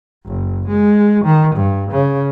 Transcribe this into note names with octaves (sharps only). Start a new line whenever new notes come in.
F#1
G#3
D#3
G2
C#3